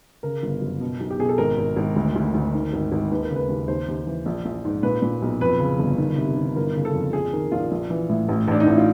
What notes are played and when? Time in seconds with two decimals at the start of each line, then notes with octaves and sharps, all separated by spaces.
0.23 C#3 A#4
0.43 G1
0.61 F#2
0.81 B2
1.00 B1
1.10 G4
1.19 B2 G#4
1.29 A4
1.38 G#1 A#4
1.58 G#1
1.76 G#1
1.96 D2
2.16 D2
2.34 D2
2.54 D#3
2.73 G#1
2.92 G#1
3.11 D#2 B4
3.23 A#4
3.30 C#3
3.35 B4
3.49 D#2
3.68 D#2 C5
3.88 D#2
4.07 E3
4.26 A#1
4.45 A#1
4.65 G#2
4.83 A#2 B4
5.02 A#2
5.22 B1
5.41 F2 B4
5.60 C#3
5.79 G1
5.98 D#3
6.17 C3
6.36 D#3
6.56 G1 A#4
6.75 C#3
6.85 A4
6.94 F2
7.13 A#1 G#4
7.33 D#3 A#4
7.52 A#1 F4
7.71 A#1
7.90 E3
8.09 A2
8.29 A1
8.48 A1 D4
8.60 D#4
8.67 A1 E4
8.78 F4